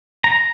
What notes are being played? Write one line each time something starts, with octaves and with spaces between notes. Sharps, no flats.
A#5